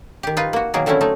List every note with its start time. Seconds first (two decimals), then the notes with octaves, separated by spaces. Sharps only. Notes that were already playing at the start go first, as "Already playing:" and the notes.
0.23 D#3 G4
0.37 D#4 F4 B4
0.53 A#3 F#4
0.74 B2 D#3 F#3 A#3 G#4 A#4
0.86 D3 F#3 A3 C4 C#4 E4
1.01 A3 D#4